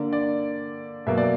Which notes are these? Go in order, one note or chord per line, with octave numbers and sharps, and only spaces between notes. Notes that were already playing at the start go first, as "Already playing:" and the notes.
Already playing: D3 A#3 D5
D5
B2 F#3 A#3 E5
D5